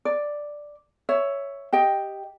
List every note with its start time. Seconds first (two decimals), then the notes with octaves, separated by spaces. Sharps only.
0.05 D5
1.09 C#5 E5
1.73 G4 D#5 G5